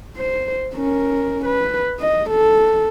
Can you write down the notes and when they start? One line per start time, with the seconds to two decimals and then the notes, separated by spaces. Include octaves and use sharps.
0.17 C5
0.75 C#4 A#4
1.45 B4
2.00 D#5
2.30 A4